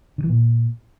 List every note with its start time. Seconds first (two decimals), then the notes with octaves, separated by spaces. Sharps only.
0.18 D3
0.24 E3
0.29 A#2